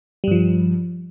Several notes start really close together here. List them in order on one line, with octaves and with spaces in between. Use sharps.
G3 G2 F3